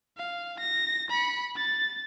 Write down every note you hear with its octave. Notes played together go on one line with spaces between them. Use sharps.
F5
A#6
B5 C#7
A6